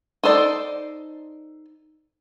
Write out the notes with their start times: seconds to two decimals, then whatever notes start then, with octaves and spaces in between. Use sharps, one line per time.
0.23 D#4 A4 C5 D5